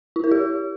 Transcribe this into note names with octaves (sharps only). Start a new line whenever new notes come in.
E4
A#4
G4